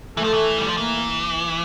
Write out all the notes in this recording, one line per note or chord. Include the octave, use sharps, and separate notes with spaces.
E3 A3
F3
E3
G3
F3
E3 A#3